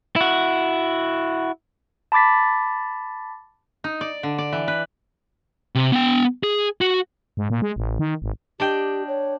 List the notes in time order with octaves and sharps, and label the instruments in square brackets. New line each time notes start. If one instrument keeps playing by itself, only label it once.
[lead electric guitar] E4 F#4
[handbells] A5 B5 D6 A6 B6
[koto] D#4
D5
D3
D5
E3
B4
[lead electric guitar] C3
B3 G5
G#4
F#4
[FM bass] G#2
A#2
G#3
A1
D#3
G#1
[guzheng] D4 D#5 G5 [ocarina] G4
[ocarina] C#5